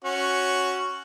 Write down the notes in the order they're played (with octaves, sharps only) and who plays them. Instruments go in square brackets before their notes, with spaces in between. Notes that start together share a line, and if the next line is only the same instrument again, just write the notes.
[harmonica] C#4 F#4